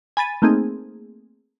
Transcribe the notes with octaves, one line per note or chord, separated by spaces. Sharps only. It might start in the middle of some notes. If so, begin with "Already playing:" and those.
G#5 B5 A6 D#7
A3 A#3 C4 D#4 G#4